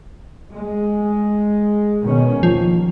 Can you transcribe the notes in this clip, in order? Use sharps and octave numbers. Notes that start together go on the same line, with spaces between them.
G#3
B2 D#3 C#4
D#2 F3